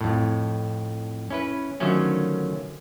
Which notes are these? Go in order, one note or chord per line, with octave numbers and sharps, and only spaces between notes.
F2 A2
C#4 E4 B4
D3 D#3 F3 F#3 A3 C#4